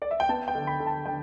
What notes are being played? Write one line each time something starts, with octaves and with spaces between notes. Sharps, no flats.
D5
E5
G5
B3 A5
G5
D3
B5
D3
A5
D3 G5